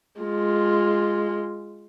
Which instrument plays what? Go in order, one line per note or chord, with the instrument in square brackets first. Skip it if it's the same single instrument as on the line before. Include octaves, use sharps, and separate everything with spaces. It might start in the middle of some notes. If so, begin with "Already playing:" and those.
[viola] G#3 F4